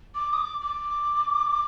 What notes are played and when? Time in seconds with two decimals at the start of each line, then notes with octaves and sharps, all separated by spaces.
0.15 D6
0.33 D#6
0.38 D6
0.61 D6